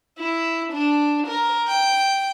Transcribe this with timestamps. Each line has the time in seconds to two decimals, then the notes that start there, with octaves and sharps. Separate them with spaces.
0.18 E4
0.73 D4
1.27 A#4
1.68 G5